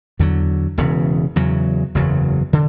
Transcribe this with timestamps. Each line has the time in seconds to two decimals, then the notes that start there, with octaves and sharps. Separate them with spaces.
0.19 E2 D3 F#3
0.78 E1 E2 C#3
1.36 E2 C#3 F#3
1.95 F#1 E2 C#3 F#3
2.53 D3